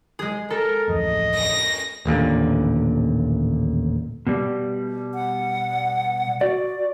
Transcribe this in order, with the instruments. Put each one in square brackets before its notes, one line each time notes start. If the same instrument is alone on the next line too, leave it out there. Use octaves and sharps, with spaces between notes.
[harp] G#3 G#4
[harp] A4 [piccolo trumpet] A#4
[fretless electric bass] D1 A1 F2 [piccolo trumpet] D#5
[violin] A#6
[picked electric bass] D#1 A1 A#2 D3
[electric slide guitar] B2 G3
[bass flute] F#5
[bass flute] F#4 [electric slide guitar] D5